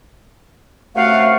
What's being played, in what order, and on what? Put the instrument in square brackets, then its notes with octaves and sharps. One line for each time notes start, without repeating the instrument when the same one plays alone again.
[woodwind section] F#2 C3 A3 [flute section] F5 F#5